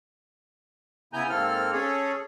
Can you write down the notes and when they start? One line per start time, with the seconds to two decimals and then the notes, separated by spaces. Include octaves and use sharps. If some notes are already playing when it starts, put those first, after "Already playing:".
1.13 C#3 B3 E4 G#5 A#5 G6
1.30 G#2 A#3 C4 A4 F6
1.73 C#4 G#4 A4 C#5